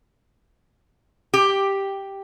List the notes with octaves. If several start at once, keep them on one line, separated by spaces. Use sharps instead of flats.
G4